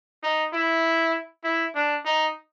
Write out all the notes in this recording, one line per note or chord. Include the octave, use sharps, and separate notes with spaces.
D#4
E4
E4
D4
D#4